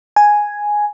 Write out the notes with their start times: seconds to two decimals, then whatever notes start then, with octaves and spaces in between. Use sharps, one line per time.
0.16 G#5